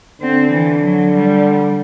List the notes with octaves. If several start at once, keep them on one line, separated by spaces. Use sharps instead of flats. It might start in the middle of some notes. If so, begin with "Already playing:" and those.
D3 C4
E3
F#3
G3